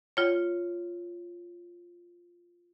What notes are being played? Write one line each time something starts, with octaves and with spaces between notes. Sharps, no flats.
F4 C#5